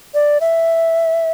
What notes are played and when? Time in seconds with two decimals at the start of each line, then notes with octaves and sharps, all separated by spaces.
0.14 D5
0.41 E5